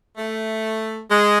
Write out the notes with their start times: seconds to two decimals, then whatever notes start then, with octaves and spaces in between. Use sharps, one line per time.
0.18 A3
1.10 G#3